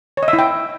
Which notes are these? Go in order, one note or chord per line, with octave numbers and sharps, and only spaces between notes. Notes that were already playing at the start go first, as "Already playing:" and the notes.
C#5
D#5
E5
E4
G5